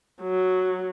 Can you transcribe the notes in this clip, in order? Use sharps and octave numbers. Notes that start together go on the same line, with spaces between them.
F#3